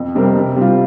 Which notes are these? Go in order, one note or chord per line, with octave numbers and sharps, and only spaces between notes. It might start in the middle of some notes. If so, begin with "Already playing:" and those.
Already playing: F2
C3 G3 C4 A#4
C3
G3 C4 F4